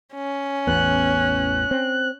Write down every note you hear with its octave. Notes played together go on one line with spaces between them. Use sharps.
C#4
A1 E2 B3 F#6
C4